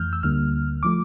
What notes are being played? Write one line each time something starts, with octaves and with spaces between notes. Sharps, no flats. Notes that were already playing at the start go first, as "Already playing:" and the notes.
Already playing: F2 E3 A3 F6 G6
E6
D2 D3 G3 A#3 F6
F3 A3 D6